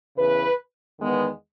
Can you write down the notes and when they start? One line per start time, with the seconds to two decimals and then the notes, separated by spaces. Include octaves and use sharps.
0.16 E2 C#3 E3 B4
0.99 E2 D#3 G#3 B3